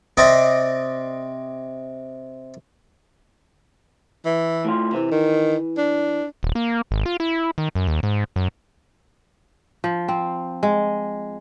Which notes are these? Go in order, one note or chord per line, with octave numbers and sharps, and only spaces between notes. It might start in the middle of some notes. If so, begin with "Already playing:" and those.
C3 C4 D5 D#5
E3
A2 A3 F4
C3 E3
D#3
D4
D#1
A#3
G#1
F4
E4
D#3
F#2
D#2
G#2
F#2
F3
C4
G#3